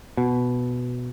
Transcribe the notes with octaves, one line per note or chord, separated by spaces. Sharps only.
B2